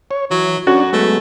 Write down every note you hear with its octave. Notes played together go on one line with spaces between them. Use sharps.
C#5
E3 F#3
F#2 C#4 D4 F#4
F#3 G#3 A3 B3